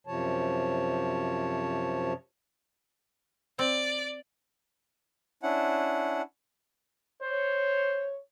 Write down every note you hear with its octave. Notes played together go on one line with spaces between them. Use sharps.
F#2 C3 F3 C#5 A5
C4 D5
C#4 D4 E4 F#5
C5 C#5